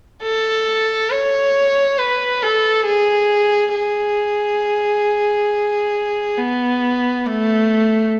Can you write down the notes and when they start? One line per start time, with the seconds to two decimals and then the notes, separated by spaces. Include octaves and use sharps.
0.23 A4
1.11 C#5
1.98 B4
2.42 A4
2.86 G#4
3.74 G#4
6.38 B3
7.26 A3